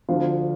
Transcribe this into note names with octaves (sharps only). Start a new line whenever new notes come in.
D2 D3 F3 F4